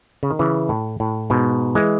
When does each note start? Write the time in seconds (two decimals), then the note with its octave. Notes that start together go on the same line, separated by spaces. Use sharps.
0.23 C#3
0.31 D#3
0.39 C#3 E3
0.69 A2
1.00 A2
1.30 G#2 B2
1.75 E3 G#3